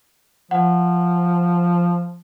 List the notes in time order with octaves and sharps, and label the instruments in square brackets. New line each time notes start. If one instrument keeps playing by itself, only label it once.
[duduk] F3 [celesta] F#5